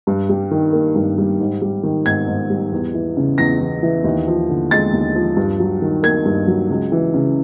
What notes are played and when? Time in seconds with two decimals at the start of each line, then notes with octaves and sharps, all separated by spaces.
0.07 G2
0.29 G3
0.51 D#3
0.73 A#3
0.95 G2
1.18 G3
1.40 G#2
1.62 G3
1.83 D#3
2.06 G#2 G#6
2.27 G#2
2.50 G3
2.72 E2
2.94 E3
3.17 C#3
3.38 E2 A#6
3.60 E2
3.83 E3
4.04 D#2
4.27 F3
4.49 D3
4.71 G#3 A6
4.93 D#2
5.15 F3
5.37 G2
5.60 F#3
5.82 D#3
6.03 A#3 G#6
6.25 G2
6.48 F#3
6.70 C#2
6.92 E3
7.14 C#3